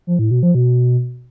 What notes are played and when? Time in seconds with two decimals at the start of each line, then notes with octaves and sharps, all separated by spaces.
0.07 F3
0.19 A2
0.31 B2
0.43 F3
0.55 B2